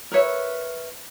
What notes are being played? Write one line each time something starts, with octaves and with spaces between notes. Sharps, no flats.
A#4 B4 C#5 E5